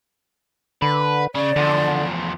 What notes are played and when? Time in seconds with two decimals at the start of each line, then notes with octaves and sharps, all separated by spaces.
0.82 D3 B4
1.35 C#3 D5
1.56 E2 D3 F3